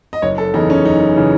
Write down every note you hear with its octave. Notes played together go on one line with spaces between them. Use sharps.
D#5
F#1 C#5
A4
E2 C#3 E3 D#4
C#4
F#1 D#4
C#3 E3